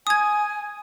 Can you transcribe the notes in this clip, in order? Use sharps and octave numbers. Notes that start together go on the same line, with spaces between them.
G#5 D#6 G#6